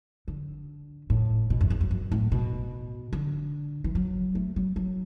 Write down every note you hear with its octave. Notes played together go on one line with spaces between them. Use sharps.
D3
A2
B2
F#2
E2
F#2
F#2
A2
B2
D3
E3
F#3
A3
F#3
F#3